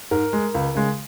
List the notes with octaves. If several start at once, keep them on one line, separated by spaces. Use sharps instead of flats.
G#2 A#4
G#3
C#2
C#3 G#3